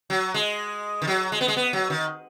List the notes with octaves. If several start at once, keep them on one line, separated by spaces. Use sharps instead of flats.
F#3
G#3
D#3
F#3
G#3
B3
G#3
B3
F#3
D#3